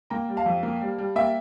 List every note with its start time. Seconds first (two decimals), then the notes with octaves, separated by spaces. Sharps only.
0.10 A#3 G5 A#5
0.29 G3
0.37 F5 A5
0.46 F2
0.63 A#3
0.81 G3
0.98 G3
1.16 A#3 E5 G5